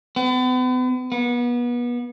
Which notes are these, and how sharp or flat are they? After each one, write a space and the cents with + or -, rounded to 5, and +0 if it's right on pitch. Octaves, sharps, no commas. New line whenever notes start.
B3 +40
B3 -30